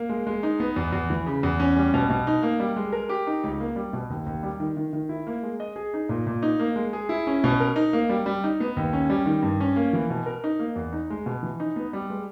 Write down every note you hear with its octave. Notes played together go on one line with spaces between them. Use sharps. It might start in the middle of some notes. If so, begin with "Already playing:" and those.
Already playing: A#3
G#3
G#3
D#4
B3
E2
E2
E3
C#3
E2
C#4
G3
B2
B2
D#4
A#3
G3
G#3
A#4
G4
D#4
C#2
A#3
G3
B2
D#2
D#2
G3
D#3
D#3
D#3
E4
A#3
G#3
D#5
G#4
D#4
A#2
A#2
D#4
A#3
G#3
G#4
E4
C#4
B2
A#4
D#4
A#3
G3
G3
D#4
B3
D#2
C#4
G3
D#3
G2
C#4
A#3
E3
B2
A#4
D#4
A#3
E2
D#4
G#3
B2
E3
D#4
B3
G3
G#3